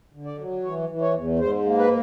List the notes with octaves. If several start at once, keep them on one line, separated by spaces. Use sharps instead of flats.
D3
D5
F#3
E3 C#5
E3
C#5
E2
G#2 C5
A#3
B4